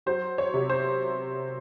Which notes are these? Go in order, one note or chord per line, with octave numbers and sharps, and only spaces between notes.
F#3 C5
C#5
C3
C5